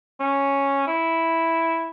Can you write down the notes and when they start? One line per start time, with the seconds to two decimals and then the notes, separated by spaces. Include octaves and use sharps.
0.20 C#4
0.87 E4